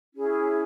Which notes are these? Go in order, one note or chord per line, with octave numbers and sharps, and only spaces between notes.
C#4 E4 G#4